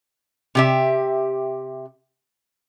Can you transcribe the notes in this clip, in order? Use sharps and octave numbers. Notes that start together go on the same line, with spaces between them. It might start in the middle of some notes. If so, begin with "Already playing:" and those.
C3 G4 E5